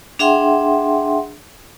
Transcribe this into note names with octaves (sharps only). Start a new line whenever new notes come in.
D4 G#4 E5 F#5 G5 C6